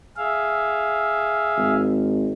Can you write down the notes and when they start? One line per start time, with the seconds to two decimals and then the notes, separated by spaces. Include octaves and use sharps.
0.17 G#4 E5 F5
1.57 G#1